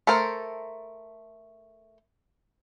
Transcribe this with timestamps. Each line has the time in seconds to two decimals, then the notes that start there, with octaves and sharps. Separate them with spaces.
0.07 A3 A4 A#4 C5